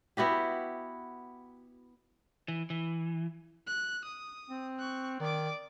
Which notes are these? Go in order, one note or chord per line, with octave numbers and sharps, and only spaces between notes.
B3 E4 F#4 G4
E3
E3
F#6
D#6
C4
C#6 F#6
D#3 D5 D6